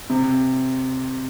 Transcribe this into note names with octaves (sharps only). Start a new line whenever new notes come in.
C3